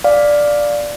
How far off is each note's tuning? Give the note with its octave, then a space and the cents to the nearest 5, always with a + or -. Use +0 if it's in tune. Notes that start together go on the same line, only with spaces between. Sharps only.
D5 +0 F5 +10